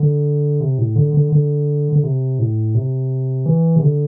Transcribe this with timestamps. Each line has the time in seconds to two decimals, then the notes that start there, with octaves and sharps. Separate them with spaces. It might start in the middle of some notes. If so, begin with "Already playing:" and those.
Already playing: D3
0.61 C3
0.78 A2
0.96 D3
1.14 D3
1.32 D3
1.93 D3
2.03 C3
2.39 A2
2.75 C3
3.46 E3
3.76 C3
3.82 D3